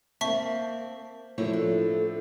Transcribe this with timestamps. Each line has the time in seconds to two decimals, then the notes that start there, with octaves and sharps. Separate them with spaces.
0.21 A#3 C4 E5 A5 C#6 B6
1.38 A2 F3 A#3 E4 A4 C#5
1.53 D4